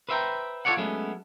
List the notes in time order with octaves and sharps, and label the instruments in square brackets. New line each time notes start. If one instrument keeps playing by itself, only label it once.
[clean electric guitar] B4 C5 E5 F5 G5 A#5
F4 G#4 A4 C#5 D5 F#5
F#3 G#3 A3 B3 C#4